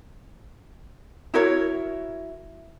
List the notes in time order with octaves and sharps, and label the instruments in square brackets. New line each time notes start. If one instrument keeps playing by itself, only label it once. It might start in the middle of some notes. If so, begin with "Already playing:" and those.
[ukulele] E4 F#4 A#4 C#5